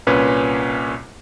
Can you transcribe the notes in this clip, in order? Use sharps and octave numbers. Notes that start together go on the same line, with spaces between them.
C2 A#2 C#4 B4 G#5